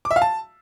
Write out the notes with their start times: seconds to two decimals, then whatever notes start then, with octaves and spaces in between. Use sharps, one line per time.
0.05 D6
0.11 E5
0.16 F5
0.22 A5